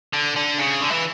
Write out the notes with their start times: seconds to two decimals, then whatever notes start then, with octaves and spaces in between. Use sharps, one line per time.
0.13 D3
0.36 D3
0.58 C#3
0.81 D3
0.92 E3